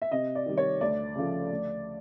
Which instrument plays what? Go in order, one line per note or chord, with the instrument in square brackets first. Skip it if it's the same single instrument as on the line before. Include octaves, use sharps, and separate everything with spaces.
[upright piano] E5
C3 D#5
D5
D#3 G3
C#5
D2 D5
C#3 F3 A3
D2